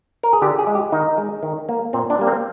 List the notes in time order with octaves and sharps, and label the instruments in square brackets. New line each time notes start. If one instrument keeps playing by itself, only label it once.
[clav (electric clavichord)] A#4
G#4
D3 G4
G#4
G#3
G4
D#3 D#4
G#3
D#3
A#3
A#2 C4
D4
G3 A#3
C4